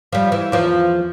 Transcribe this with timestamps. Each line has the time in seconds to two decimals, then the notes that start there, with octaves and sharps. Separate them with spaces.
0.12 F3 G3
0.32 E3
0.52 E2 F3